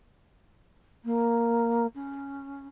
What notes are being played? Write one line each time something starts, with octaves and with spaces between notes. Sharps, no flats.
A#3
C#4